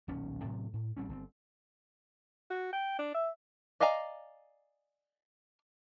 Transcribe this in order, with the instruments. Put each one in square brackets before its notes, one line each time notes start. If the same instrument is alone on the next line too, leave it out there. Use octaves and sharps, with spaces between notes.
[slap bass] D#1 B1 C#4
A2 C3 F3 F#3
A2
A#1 G3 C4 C#4
G1 C4
[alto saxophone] F#4
G5
D4
E5
[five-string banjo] D5 D#5 F5 G#5 A#5